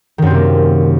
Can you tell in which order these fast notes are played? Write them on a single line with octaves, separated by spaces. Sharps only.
D#3 F#2 C4 C3 A#3